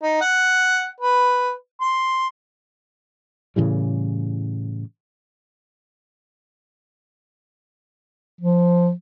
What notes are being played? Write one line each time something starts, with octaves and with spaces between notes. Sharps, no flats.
D#4
F#5
B4
C6
A2 C#3 E3 G3
F3